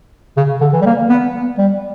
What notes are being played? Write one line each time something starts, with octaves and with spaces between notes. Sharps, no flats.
C#3
D3
E3
G3
A#3
B3
G3